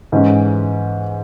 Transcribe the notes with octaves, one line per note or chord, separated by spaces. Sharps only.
G#2 E3 G#3 C#4